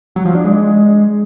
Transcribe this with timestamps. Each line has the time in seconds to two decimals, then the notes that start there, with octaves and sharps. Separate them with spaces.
0.16 F#3
0.26 F3
0.35 D4
0.44 G#3